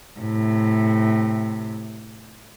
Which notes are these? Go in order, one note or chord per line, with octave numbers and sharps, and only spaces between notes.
A2 C3